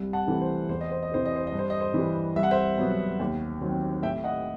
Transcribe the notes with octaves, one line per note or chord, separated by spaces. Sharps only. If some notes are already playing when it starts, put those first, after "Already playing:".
Already playing: C2
F#5 A5
C3 E3 A3 C4
C5
E2 C5
D#5
C5
D#5
C3 E3 C5
D#5
C5
D#5
G2
C5
D#5
C5
E3 G3
C2 E5
F#5
C5 E5
B2 F#3 B3
D#2
D#3 F#3 C4
A2 E5 G5
D#5 F#5